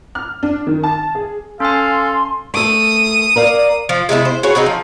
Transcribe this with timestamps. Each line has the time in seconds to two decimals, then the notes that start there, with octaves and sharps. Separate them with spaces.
0.15 F6
0.43 D4
0.67 D#3
0.83 A5
1.15 G#4
1.60 C#4 A4 F5 G#5 C6
2.54 A3 A4 D#6
3.36 A#4 D5 F5
3.89 F3
4.09 C3 G#3 B3 E4
4.25 C5
4.43 F#4 G#4 B4 C#5
4.55 C4 D#4 F#4 G#4
4.66 F3